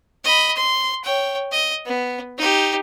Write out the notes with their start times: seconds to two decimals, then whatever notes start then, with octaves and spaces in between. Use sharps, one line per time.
0.24 D#5 B5
0.56 C6
1.04 C#5 G5
1.52 D#5
1.86 B3
2.38 D#4 G4